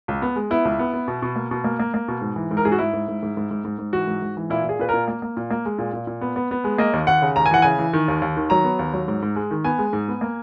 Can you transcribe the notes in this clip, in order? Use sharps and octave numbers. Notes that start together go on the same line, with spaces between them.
C#2
B3
G#3
B3 E4
C#2
B3
B3
B2
B2
A#3
B2
A#3
A#3
A#3
B2
G#2
E3
G#2
A#4
G#2 G#4
F#4
G#2 E4
G#2
G#2
G#2
G#2
G#2
G#2
G#2
E3 F#4
G#2
G#2
E3
A#2 E4
A#2 G#4
A#2 B4
A#4
A#2
A#3
A#3
A#2
A#3
G#3
A#2
A#2
A#2
B3
B3
B3
G#3
A#3 D#5
D#2
D#2 F#5
C#3
D#2 A#5
G#5
E3 F#5
C#3 G#5
E3
D#3
D#2
D#2
D#3
F#3 A#5
B3
D#2
F#3
G#2
G#2
G#3
D#3
B3 G#5
G#3
G#2
B3
A#3